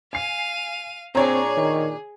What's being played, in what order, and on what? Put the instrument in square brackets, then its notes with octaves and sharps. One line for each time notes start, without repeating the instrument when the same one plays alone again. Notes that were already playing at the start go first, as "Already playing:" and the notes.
[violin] F5 D#7 [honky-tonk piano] G#5 C7
[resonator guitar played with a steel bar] A#2 D4 D5 [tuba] C4 [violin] G#4 [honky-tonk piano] C#5 A#5
[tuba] D#3